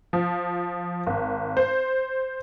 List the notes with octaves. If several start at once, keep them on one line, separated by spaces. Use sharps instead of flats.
F3
G#1
C5